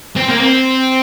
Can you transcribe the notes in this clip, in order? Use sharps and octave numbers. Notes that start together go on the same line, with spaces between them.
C4
A#3
C4